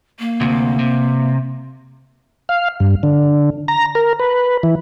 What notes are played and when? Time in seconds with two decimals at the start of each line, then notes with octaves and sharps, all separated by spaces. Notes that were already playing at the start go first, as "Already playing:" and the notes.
0.19 A#3
0.41 D2 C3
0.79 C3
2.49 F5
2.80 G2
3.03 D3
3.68 A#5
3.95 A#4
4.20 B4
4.63 E3